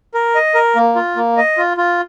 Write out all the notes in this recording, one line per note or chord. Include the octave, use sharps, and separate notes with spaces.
A#4
D#5
A#4
A#3
F4
A#3
D#5
F4
F4